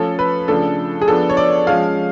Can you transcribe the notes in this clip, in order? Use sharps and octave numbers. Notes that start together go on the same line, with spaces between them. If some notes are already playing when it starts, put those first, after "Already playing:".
Already playing: F3 A3 C#4 A4
B4
C#3 F3 A3 D4 A4
G#4
F3 B3 D4 A4
C#5
D5
F3 G#3 C#4 F5